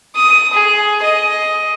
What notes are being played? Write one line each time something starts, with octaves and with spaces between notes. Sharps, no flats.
D#6
G#4
D#5